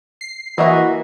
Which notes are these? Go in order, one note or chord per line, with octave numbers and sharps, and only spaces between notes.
C7
E3 A#3 F#4 D#5 E5